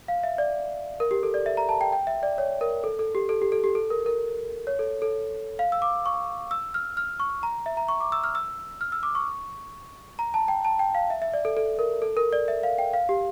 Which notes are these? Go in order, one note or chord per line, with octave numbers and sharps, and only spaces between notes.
F5
E5
D5
A#4
G4
A4
D5
E5
A#5
A5
G5
G5
E5
D5
C#5
A#4
A4
A4
G4
A4
G4
A4
G4
A4
A#4
A#4
C#5
A4
A4
F5
E6
D6
C#6
E6
F6
F6
C#6
A#5
E5
A#5
C#6
D6
E6
F6
E6
F6
E6
D6
C#6
A#5
A5
G5
A5
G5
F5
E5
E5
D5
A4
A4
A#4
A4
A#4
D5
E5
F5
G5
F5
G4